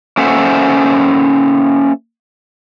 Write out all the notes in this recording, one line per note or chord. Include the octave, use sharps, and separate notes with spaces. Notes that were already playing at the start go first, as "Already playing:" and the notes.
A#3 C#4 A4 C5 E5 F#5